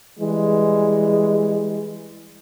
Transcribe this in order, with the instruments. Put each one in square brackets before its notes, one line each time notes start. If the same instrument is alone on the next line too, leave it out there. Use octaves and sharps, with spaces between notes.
[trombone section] E3 G3 G#3